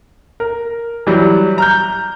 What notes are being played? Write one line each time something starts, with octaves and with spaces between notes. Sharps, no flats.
A#4
E3 F#3 G3
A#5 F6 G6